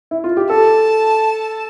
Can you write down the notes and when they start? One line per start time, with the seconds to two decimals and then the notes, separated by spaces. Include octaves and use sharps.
0.11 E4
0.24 F4
0.37 G4
0.50 A4 A5